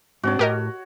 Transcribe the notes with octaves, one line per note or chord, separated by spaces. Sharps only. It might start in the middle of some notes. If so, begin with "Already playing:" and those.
G#2 C4 D4 F#4 C#5
A2 G4 A#4 D#5